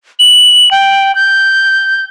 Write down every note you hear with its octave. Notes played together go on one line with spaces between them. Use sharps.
F#7
G5
G6